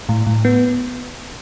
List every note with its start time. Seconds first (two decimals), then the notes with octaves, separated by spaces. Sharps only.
0.09 A2
0.26 A2
0.45 B3